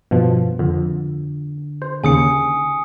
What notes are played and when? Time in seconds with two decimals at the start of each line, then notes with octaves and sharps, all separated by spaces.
0.11 G2 B2 F3
0.59 F2 D3
1.82 C5
2.04 D#2 C#3 G#5 D#6 C#7